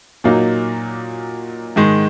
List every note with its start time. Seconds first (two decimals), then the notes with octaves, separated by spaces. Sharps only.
0.24 A#2 F#3 A#3 D#4
1.76 G#2 D#3 G#3